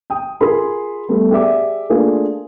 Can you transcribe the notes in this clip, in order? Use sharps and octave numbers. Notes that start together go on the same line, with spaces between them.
G5 D#6
F4 G#4 A#4 G#5 B5 C6
G3 A3 B3
G4 G#4 D5 E5 D6
A3 A#3 D4 F4 G#4